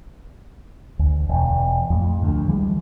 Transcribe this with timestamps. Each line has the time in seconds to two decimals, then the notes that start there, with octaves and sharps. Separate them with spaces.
0.99 D2
1.29 E1
1.90 F2 A2
2.23 D2
2.48 E3 G3 G#3